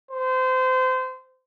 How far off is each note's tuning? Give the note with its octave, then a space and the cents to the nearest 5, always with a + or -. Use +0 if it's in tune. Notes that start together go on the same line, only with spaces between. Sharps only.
C5 -25